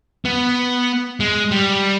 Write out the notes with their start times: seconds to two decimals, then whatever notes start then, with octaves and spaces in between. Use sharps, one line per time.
0.25 B3
1.20 G#3
1.51 G3